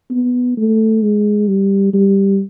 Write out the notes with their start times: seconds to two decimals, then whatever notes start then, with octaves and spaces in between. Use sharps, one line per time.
0.11 B3
0.57 A3
1.02 G#3
1.48 G3
1.93 G3